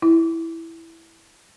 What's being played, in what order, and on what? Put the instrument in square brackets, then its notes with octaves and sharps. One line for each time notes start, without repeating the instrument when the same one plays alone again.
[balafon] E4